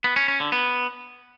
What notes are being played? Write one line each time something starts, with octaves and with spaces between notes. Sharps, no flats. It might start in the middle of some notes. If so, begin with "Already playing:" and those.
B3
C#4
C#4
D3
B3